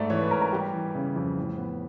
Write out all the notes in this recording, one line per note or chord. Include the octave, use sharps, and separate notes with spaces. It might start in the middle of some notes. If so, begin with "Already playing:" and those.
Already playing: G#2 A3 D5 E5
E3 C#5
B4
G#2 A#4
A#4
G3 G4
E3
C#3
F2
A2
B3